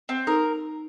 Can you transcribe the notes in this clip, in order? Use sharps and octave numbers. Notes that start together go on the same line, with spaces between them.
C4
D#4 A#4